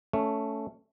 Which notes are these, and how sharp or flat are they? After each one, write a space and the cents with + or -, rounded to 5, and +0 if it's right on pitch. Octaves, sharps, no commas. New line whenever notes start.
A3 +0 C#4 +10